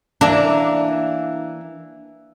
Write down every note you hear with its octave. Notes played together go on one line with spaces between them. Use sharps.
E3 A#3 D4